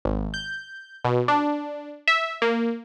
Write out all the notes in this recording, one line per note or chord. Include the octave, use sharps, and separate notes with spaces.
G#1
G6
B2
D4
E5
A#3